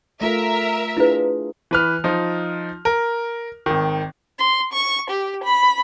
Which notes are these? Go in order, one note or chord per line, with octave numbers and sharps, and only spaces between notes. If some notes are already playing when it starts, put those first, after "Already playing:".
A3 F4 A4 A#4 E5
D4 E4 F4 G#4 B4
E3 B4 F6
F3 D#4
A#4
G#1 D#3
C6
C#6
G4
B5